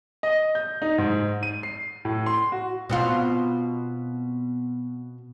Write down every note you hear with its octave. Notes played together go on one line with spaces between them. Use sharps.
D#5
G6
D#4
G#2
D#7
C7
A2
C6
F#4
B2 C4 F4